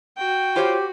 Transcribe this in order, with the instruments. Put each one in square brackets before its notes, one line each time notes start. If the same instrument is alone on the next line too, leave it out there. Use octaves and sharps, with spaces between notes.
[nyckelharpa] F#4 [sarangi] G5
[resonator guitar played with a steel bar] F4 C5 C#5 [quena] G4